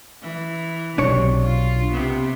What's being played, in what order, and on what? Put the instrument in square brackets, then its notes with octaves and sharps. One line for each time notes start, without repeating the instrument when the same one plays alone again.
[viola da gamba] E3
[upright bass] B1 [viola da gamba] C3 [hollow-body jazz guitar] D4 C#5
[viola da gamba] F4
C3 B3